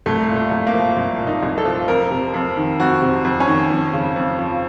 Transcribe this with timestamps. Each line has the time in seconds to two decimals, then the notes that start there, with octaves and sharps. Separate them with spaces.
0.06 C2 A3
0.29 A#2
0.36 A3
0.51 C2
0.67 A#3
0.74 F3
0.97 C2
1.20 A#2
1.27 D#4
1.43 C2
1.58 A4
1.65 F3
1.88 F2 A#4
2.11 C3
2.34 F2
2.57 D#3
2.80 F2 F#4
3.02 C3
3.24 F2
3.40 C#4
3.47 D#3
3.70 F2
3.93 C#3
4.16 F2
4.39 F3